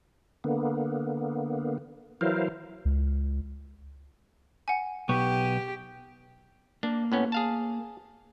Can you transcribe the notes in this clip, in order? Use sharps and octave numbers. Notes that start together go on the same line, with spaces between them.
D3 A#3 B3
E3 F#3 E4 A#4 C5 F5
C#2
F#5 G#5
B1 B3 G4 C#6
A#3 D4
A2 B3 C#4
G#4 F5 A5